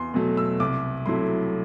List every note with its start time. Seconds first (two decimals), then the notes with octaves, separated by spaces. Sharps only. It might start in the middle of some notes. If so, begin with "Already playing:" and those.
Already playing: E2 C6
0.14 B2 F#3 A3
0.37 E6
0.60 C2 D6
1.06 C3 F#3 A3 E4 C6